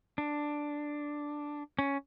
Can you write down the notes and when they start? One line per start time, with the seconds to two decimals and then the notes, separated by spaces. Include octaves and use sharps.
0.18 D4
1.79 C#4